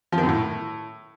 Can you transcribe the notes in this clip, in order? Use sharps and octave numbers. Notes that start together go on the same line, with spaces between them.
F3
D#3
F#2
A2